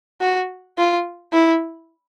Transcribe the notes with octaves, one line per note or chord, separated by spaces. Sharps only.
F#4
F4
E4